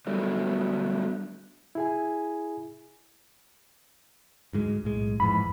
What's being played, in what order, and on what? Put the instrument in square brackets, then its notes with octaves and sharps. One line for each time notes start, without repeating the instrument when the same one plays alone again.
[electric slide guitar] D3 F#3 G3 A3 B3
[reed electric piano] E4 G#4 G#5
[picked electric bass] D2 G#2 G#3
B1 A2 G#3
[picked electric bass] A#1 F2 E3 [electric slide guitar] G#2 [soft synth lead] B5